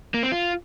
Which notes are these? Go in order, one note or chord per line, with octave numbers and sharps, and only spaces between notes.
A#3
C4
F4